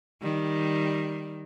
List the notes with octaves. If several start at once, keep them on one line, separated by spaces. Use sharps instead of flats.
D#3 G3